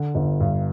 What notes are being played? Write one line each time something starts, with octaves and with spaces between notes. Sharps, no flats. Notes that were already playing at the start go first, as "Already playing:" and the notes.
Already playing: D3
G1
G2